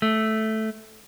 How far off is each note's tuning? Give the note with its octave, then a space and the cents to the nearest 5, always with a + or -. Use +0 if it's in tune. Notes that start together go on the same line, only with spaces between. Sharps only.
A3 -5